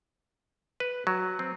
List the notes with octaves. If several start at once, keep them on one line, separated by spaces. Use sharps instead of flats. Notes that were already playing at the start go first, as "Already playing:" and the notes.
B4
F#3
C4